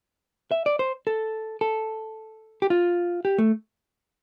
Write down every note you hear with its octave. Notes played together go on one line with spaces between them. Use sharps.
E5
D5
C5
A4
A4
G4
F4
G4
A3